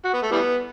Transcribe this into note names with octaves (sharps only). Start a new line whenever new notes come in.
F#4
B3
A3
E3 G3 B3